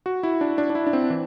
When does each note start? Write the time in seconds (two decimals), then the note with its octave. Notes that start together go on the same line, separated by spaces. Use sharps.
0.06 F#4
0.23 E4
0.41 D4
0.58 D4
0.70 D4
0.75 E4
0.87 D4
0.93 C4
1.10 E3